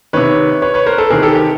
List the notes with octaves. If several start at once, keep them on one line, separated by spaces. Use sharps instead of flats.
C3 D#3 B4 C#5
B4 C#5
B4 C#5
A#4 C5
A4 B4
C3 D#3 G#4 A#4
G4 A4
G4